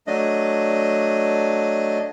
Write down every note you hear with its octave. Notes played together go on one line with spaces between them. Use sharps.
F#3 A3 D4 D#5